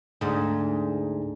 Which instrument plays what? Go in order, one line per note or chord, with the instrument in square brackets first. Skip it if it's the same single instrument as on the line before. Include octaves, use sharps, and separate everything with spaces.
[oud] D2 G#2